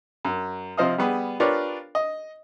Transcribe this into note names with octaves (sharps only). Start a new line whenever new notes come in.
F#2
C3 F3 C5 D#5 F5 D#6
G3 B3 G#4
D4 F4 G4 A#4 B4 C#5
D#5